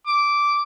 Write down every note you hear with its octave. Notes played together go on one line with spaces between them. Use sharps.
D6